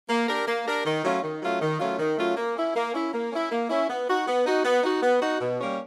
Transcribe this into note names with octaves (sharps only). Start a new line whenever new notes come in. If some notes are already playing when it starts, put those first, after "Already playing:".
A#3
D4 G4 A#4
A#3
D4 G4 A#4
D#3
F#3 A3 C#4 F4
D#3
F#3 A3 C#4 F4
D#3
F#3 A3 C#4 F4
D#3
F#3 A3 C#4 F4
A#3
C#4 E4
A#3
C#4 E4
A#3
C#4 E4
A#3
C#4 E4
B3
D#4 F#4
B3
D#4 F#4
B3
D#4 F#4
B3
D#4 F#4
B2
G3 A#3 C#4